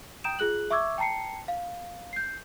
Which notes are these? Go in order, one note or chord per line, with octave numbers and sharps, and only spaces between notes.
G5 A#5 D#6 G6 D7 E7
F4 G#4 F#6 F#7
E5 C#6 D6 E6 G#6
G5 A5 A#5 C7 C#7
F5
G6 C7